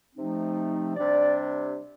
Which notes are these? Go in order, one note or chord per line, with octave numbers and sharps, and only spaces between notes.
C3 F3 A3 C4 D#4
C3 G3 D4 D5